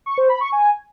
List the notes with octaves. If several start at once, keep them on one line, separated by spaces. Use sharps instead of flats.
C#6
C5
B5
C#6
G#5